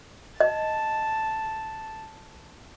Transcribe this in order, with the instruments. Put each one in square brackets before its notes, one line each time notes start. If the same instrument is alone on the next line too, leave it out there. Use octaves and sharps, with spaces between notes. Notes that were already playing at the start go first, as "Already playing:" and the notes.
[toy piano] D#5 [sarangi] A5